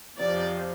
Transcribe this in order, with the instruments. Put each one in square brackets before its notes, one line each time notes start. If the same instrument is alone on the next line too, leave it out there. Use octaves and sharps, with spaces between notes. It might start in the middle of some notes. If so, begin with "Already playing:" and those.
[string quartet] F2 C3 F3 D5